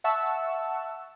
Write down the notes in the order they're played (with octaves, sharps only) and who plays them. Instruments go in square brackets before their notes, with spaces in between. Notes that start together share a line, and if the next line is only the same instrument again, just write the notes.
[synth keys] E5 F#5 A5 C#6 E6